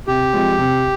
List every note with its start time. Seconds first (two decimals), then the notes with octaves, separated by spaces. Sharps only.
0.07 C3 G4
0.33 F3 G#3 C4
0.58 C3